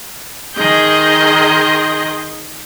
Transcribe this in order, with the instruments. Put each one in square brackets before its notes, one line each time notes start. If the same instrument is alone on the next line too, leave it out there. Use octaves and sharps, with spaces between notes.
[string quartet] D#3 G#4 D#5 C6 G6